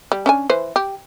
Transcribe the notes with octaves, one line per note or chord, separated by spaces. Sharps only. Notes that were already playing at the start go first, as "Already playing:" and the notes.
G3
C#4 D4 G#5
E3 B4 C5
G4